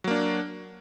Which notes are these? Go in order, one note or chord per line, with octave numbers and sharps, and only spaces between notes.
F#3 A#3 D4